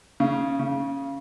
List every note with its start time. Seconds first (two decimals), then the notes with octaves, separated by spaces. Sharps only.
0.20 C#3
0.59 C#3